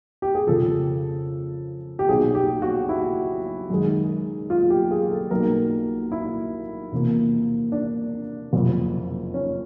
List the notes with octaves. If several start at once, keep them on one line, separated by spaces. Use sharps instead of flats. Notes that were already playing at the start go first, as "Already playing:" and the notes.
G4
G#4
F2 C#3 F3 A4
G4
B1 B2 F#3 G#4
G4
F#4
E4
F#2 D#3 G#3
F4
G4
G#4
A4
B1 B2 G3 A#3 A#4
E4
E2 C3 F3 A#3
D4
F#1 F2 C3
C#4